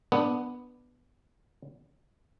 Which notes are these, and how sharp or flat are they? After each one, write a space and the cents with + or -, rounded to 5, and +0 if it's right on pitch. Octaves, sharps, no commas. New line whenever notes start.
B3 +0 D4 +10